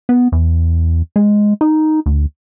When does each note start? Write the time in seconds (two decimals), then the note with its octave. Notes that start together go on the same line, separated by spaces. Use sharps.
0.09 B3
0.32 E2
1.16 G#3
1.61 D#4
2.06 D2